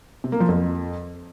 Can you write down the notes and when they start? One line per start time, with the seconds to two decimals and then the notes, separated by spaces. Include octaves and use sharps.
0.24 C3
0.32 A#3
0.40 F3
0.49 F2